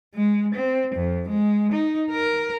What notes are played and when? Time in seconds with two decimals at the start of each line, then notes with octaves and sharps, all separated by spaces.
0.15 G#3
0.55 C4
0.95 F2
1.29 G#3
1.72 D#4
2.11 A#4